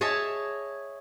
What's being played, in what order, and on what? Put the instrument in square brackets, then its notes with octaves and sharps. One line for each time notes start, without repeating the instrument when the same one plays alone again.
[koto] G#4 C#5 D#5 E5 A5